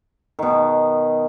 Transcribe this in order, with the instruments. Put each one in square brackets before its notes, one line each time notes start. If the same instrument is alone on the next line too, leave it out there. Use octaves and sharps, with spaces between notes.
[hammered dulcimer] B2 D#3